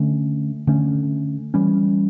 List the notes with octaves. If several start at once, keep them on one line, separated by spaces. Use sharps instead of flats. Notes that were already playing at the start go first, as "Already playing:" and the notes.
Already playing: D3 A3 C#4
D3 A3 C#4
E3 G3 C#4